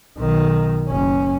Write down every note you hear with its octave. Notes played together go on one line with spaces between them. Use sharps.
B1 D#3
F#1 C#4